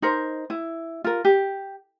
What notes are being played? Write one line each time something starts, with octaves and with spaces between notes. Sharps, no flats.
D#4 A#4 C5
E4
F4 A#4
G4